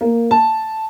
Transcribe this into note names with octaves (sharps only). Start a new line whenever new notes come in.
A#3
A5